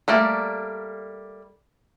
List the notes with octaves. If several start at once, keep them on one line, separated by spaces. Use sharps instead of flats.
G3 A3 A#3 D5